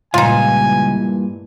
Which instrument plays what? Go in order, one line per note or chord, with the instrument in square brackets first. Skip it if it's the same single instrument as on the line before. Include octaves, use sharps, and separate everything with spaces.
[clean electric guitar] C#2 F3 [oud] G2 A#2 E3 [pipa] D#4 F4 [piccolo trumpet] G#5